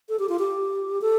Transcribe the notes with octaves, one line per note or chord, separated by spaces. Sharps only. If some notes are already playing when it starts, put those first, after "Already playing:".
A4
G4
F4
G4
A4